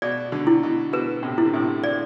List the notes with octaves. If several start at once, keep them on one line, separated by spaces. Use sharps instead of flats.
B2 D5
B2 D3
E4
B2
B2 B4
A2 C3
E4
D3
A2 C3
D5